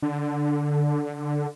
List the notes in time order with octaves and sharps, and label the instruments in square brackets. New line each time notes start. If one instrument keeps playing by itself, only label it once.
[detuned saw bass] D3